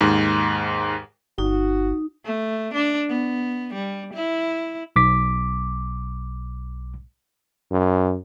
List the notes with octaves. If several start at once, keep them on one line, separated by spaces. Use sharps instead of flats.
D#2 G#2
G1 D#4 F#4
A3
D4
B3
G3
E4
B1 D6 B6
F#2